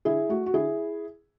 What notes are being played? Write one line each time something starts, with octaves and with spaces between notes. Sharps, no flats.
D3 E4 G#4
A3 F#4
F#4
D3 E4 G#4